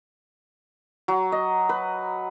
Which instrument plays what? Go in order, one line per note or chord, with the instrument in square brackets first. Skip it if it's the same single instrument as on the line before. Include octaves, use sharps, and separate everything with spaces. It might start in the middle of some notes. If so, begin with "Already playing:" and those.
[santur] F#3
D#5
B4